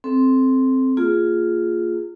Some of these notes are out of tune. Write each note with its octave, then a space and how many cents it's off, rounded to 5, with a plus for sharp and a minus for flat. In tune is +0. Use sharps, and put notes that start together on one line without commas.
C4 +0 A4 -20
A#3 -25 F4 +0 G#4 +0